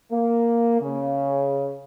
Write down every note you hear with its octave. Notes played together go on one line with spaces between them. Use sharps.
A#3
C#3